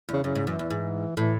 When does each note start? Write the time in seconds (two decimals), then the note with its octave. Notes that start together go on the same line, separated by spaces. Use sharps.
0.09 E2 C#3
0.24 F#2 C#3
0.35 G#2
0.47 F#2 E3
0.59 E2
0.70 G#2
1.17 A2 E3